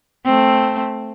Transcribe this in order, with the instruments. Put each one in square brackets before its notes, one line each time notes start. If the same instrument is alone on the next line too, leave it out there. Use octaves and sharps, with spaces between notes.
[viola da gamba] A3 C4